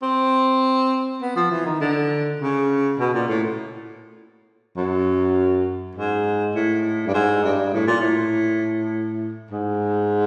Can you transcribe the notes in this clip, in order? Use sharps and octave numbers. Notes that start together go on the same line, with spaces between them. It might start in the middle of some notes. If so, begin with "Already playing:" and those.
C4
B3
F3
E3
D#3
D3
C#3
B2
A#2
A2
F#2
G#2
A2
G2
G#2
G2
A2
A#2
A2
G#2